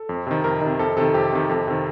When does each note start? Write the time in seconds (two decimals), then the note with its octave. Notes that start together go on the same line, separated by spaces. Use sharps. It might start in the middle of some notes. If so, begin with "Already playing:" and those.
Already playing: A4
0.09 F2
0.27 C3 D#3
0.44 F2 A#4
0.61 C3 D#3
0.79 F2 A4
0.97 C3 D#3 A4
1.14 F2 G4
1.32 C3 D#3
1.49 F2 A4
1.67 C3 D#3